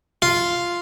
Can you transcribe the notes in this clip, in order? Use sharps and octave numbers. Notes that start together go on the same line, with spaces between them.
F4